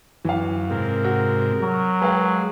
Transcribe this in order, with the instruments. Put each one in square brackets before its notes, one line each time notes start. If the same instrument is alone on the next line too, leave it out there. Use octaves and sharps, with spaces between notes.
[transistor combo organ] F#2 [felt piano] E3 F5
[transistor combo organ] G#2 C3 [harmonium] A#4
[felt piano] F#4
[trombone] F#3
[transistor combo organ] G#3 [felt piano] B4 F5 G5